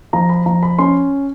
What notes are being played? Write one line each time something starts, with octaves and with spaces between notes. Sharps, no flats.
F3 A#5
B5
F3 A#5
B5
C#4 C6